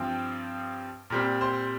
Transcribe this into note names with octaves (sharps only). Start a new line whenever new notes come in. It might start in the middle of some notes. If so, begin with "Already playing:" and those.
Already playing: G2 F3 C4 G5
A#2 G3 C4
C5